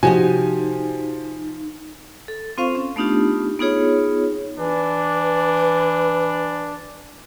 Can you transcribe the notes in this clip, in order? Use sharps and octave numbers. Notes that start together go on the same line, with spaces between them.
C3 F3 D#4 F#4 G4 D#5 G#5
A4
C4 F4 C5 F5 C#6
C#4
A3 B3 D4 D#4 F4 G4
B3 D#4 F4 G#4 C#5
E3 D4 B4